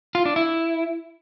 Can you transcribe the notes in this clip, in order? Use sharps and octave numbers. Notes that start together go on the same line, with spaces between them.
F4
D4
E4